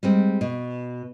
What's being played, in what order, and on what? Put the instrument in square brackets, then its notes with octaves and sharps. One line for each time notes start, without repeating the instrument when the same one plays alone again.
[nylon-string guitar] G3 G#3 C4
B2